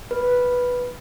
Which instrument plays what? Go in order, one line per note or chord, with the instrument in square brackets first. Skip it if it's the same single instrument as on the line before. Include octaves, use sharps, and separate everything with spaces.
[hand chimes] B4